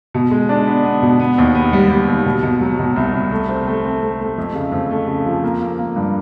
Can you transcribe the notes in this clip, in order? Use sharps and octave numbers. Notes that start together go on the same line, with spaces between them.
B2
G#3
D4
B3
B3
B2
B3
D#2
B3
G3
G3
D#2
B2
B2
F#3
B2
C2
C2
A3
C4
A3
C4
A3
A3
F2
C#3
F2
A3
C#3
F3
A#3
A#3
A#3
G2